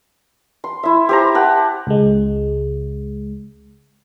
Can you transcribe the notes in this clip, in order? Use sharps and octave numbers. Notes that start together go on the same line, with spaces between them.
C6
E4 E5
G4 C5 A#5
G4 F#5 A5
C#2 G#3